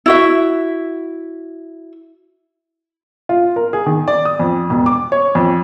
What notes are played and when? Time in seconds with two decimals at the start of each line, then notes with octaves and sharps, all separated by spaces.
0.06 E4 F#4 E5
3.29 F4
3.56 A#4
3.73 G#4
3.86 D#3
4.08 D5
4.25 D#6
4.40 F2
4.70 E1
4.86 D6
5.12 C#5
5.35 F2